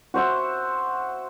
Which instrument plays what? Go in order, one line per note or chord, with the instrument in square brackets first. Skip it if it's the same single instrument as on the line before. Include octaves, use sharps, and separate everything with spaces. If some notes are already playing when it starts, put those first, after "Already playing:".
[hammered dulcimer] F#4 C5 E5 F#5